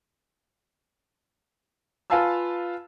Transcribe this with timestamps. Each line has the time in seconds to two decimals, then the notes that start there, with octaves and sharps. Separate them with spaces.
2.10 F4 B4 F5 G#5 A5 E6